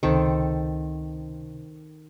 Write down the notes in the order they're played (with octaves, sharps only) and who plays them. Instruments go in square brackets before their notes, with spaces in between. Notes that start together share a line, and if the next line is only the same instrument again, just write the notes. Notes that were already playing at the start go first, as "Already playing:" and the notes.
[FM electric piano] C#2 C3 [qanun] D#3 C4 A4